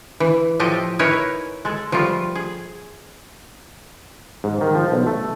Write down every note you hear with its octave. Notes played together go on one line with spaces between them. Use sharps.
E3
A2 F3 G4 A4 D#5
D#4 E4 A#4 B4 C#5 G#5
G#3 A4
F3 G3 A3 F4
G#4
G#2
D#3
F3
B1
A3